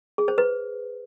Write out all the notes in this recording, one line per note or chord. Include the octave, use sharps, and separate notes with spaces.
G#4
C5
B4